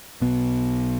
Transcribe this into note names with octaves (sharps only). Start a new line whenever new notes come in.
B1 B2 B3